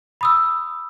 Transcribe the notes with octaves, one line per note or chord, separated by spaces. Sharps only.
B5 D#6 E6